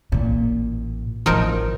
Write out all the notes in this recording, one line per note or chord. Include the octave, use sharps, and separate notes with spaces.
A1 A#2
A1 D3 F3 D#4 A#4